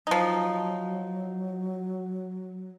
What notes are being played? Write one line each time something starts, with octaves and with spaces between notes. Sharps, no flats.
F3 F#3 D#4